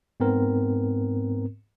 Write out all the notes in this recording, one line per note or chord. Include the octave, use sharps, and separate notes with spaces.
G#2 B3 C4 A#4